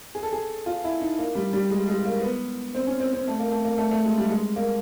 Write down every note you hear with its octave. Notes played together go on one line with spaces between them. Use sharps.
G#4
A4
G#4
F4
E4
D#4
A#3
G3
G3
G#3
G#3
A#3
B3
C4
C#4
C4
C4
A3
A#3
A3
A#3
A3
A3
G#3
G3
G#3
A#3